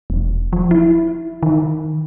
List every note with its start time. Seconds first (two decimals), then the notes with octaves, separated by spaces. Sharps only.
0.10 E1
0.53 F3
0.71 E4
1.43 D#3